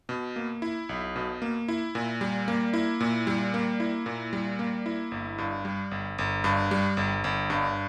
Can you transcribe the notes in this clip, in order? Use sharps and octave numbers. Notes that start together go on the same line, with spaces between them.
B2
A#3
E4
B1
B2
A#3
E4
A#2
G3
A#3
E4
A#2
G3
A#3
E4
A#2
G3
A#3
E4
G1
G2
G3
G1
G1
G2
G3
G1
G1
G2